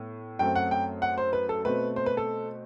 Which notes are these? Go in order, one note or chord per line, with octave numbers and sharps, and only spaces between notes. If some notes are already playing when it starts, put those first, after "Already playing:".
Already playing: A2 B3
F#2 F#3 A3 C4 G5
F#5
G5
F#5
C5
B4
A4
B2 A3 C4 B4
C5
B4
A4